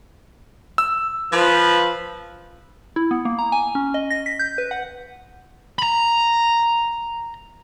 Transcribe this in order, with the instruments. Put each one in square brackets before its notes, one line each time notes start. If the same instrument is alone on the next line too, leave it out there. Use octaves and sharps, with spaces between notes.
[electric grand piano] E6
[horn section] F3 B4
[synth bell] E4
B3
A#3
A#5
G#5
C#4
D#5
A#6
B6
G6
B4
F#5
[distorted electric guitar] A#5 B5